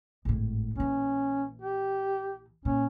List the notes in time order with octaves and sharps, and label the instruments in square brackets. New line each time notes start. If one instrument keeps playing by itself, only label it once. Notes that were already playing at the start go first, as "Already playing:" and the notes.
[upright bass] G#1 A2
[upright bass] A#1 E3 [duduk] C#4
[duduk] G4
[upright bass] A#2 [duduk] C#4